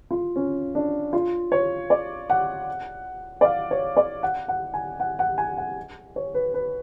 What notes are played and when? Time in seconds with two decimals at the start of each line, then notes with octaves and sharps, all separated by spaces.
0.11 F4
0.36 C#4
0.75 D4
1.13 F4
1.52 C#5
1.90 D5
2.30 F#5
3.41 D5
3.45 F5
3.71 C#5
3.97 D5
4.23 F#5
4.48 F#5
4.74 G#5
5.00 F#5
5.19 F#5
5.38 G#5
5.57 F#5
6.16 C#5
6.34 B4
6.54 B4